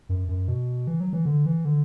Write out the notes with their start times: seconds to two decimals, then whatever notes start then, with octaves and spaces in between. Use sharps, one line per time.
0.09 F#2
0.28 F#2
0.48 B2
0.87 E3
1.00 F#3
1.13 E3
1.25 D3
1.46 E3
1.65 D3